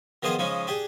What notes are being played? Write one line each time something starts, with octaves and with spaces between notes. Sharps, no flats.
D#3 F3 B3 G#4 C5 D#5
C#3 F3 G#3 C#4 D#4
D4 G4 G#4